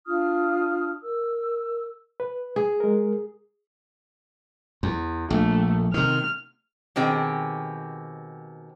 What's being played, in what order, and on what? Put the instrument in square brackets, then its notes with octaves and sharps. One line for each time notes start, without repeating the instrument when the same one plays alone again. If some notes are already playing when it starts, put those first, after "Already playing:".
[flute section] D4 F4 D#6 F6
A#4 E6
[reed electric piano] B4
[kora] G#4
[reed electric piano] G#3 A#4
[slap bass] E2
[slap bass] A#1 [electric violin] A3
[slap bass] C3 D#3 [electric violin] F6
[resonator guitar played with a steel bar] B2 D#3 C4 G4 G#4